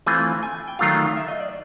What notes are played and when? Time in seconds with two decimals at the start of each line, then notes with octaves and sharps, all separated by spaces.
0.06 E3 A3 C4 F4 G#5
0.43 G#5
0.68 G5
0.79 D#3 F#3 A3 D4 F4 F5
1.17 E5
1.28 D#5
1.40 D5